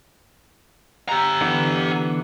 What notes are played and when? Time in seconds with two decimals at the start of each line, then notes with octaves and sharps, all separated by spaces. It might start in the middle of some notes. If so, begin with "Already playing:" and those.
1.09 G4 A#5
1.41 D3 E3 B3